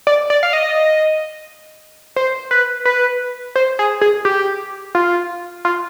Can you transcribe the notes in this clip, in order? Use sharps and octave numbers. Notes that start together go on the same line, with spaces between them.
D5
D5
F5
D#5
C5
B4
B4
C5
G#4
G#4
G4
F4
F4